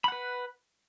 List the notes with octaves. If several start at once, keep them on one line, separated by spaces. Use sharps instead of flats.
B4 F#5 B5